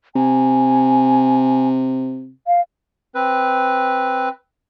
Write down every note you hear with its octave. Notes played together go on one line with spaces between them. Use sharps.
C3 G#5
F5
C4 B4